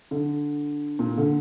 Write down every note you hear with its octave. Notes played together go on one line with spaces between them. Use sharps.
D3
A#2
D3